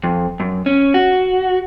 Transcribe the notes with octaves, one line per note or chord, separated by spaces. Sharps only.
F2
F#2
C#4
F#4